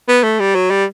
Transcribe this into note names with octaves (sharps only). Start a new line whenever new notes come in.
B3
A3
G3
F#3
G3